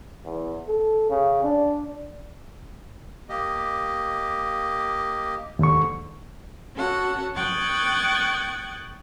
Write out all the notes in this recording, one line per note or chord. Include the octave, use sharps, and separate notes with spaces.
E2
A4
C#3
D4
A#3 G4 D#5
D#2 G#2 D3 C#6
C#4 F#4 A4 F#5
G5 C#6 D#6 F#6 G#6 A6